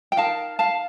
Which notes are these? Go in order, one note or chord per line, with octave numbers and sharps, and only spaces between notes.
G5
D#4 A#4 F5 A5
F5 A5